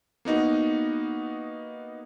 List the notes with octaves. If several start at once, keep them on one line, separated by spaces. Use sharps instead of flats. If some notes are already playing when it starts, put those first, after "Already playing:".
A#3 B3 D#4 F#4